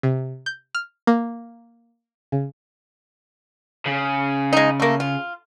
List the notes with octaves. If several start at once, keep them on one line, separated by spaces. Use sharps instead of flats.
C3
G6
F6
A#3
C#3
C#3
G#3 D#4
A3 A#3
F4